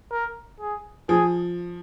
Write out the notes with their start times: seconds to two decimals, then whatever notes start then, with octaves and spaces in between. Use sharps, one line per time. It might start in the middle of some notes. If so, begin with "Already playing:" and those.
0.11 A#4
0.60 G#4
1.09 F3 G#4